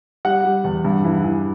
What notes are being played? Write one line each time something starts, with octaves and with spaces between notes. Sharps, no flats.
G3 F#5
G3
E2
G2
E3
E3